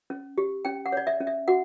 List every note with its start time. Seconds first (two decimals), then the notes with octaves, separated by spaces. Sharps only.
0.10 C#4
0.38 G4
0.65 C#4 G5
0.86 F#5
0.92 C#5 D5
1.07 E5
1.20 C#4
1.27 E5
1.48 F#4 F#5